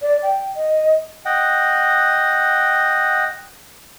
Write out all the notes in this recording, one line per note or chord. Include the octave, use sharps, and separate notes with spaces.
D5
G5
D#5
D#5 F#5 G5